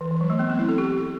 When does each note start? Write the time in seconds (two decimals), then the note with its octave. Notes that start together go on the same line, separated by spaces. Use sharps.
0.01 E3
0.11 E3
0.21 F#3
0.30 A3
0.39 B3
0.50 C4
0.59 E4
0.69 A4
0.78 G4
0.98 A4